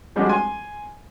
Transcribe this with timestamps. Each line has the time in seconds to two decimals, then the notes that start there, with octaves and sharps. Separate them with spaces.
0.16 F3 G3 G#3 C#4 D4 F#4
0.29 G#5 C6